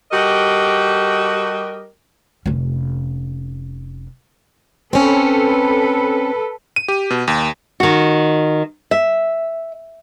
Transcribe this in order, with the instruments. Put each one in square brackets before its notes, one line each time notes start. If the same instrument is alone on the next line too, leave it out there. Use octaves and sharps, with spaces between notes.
[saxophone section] G3 F#4 G4 A4 A#4 D#5
[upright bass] F1 C#4
[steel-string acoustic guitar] C4 C#4 [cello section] A4 B4
[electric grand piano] D#7
G4
B2
D#2
[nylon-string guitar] D#3 F#4
E5